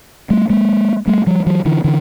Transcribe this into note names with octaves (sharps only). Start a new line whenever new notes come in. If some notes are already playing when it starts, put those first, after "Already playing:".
G3 A3
G#3 A#3
G3 A3
F3 G3
E3 F#3
D3 E3
D3 E3